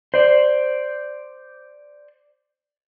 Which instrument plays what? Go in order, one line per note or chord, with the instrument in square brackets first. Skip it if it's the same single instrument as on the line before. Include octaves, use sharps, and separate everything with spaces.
[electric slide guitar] C5 D5